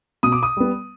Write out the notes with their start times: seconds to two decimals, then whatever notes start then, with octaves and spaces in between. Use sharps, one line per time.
0.23 B2 D#6
0.32 D6
0.43 D#6
0.57 G3 B3